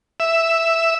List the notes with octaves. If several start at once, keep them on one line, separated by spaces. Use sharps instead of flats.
E5